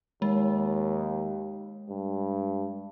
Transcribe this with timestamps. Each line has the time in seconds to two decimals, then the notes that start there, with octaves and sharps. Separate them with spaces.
0.22 D#2 G#3
1.89 G2